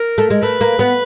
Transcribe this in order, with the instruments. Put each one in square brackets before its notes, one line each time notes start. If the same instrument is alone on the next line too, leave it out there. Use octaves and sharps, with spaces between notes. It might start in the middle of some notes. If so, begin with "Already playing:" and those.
Already playing: [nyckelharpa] A#4
[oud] A3
G#3
[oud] A3 [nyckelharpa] B4
[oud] A#3
B3